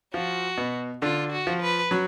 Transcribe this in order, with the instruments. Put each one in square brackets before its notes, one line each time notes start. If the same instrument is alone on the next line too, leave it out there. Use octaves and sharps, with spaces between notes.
[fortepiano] F3 F4 [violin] F#4
[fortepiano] B2 B3
[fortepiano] D3 D4 [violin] F4
[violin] F#4
[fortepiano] F3 F4
[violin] B4
[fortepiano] F#3 F#4